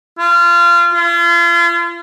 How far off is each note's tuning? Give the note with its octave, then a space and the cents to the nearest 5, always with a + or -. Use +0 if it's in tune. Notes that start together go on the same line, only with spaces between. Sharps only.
F4 -25
F4 -40